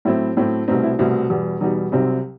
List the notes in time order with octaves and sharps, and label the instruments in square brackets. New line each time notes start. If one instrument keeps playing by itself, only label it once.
[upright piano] A2 F#3 A3 C4 E4
A2 F#3 A3 C4
C2 B2 A3 C4 D#4
E4
C2 B2 A3 C4 E4
E2 B2 G3
E2 B2 G3 D#4
C2 C3 F#3 C4 D#4